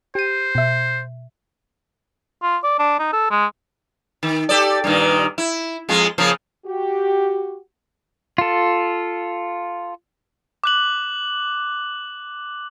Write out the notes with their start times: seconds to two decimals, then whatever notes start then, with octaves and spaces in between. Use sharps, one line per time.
0.15 G4 C5 D#7
0.55 B2 E5
2.42 F4
2.63 D5
2.79 D4
2.99 D#4
3.13 A4
3.31 G#3
4.23 D#3
4.49 G4 A4 D5
4.84 G2 A#2 D#3
5.38 E4
5.89 F2 G#3 F4
6.18 C#3 F3 A#3
6.66 F#4 G4
8.38 F4 A4
10.64 D6 F#6 F#7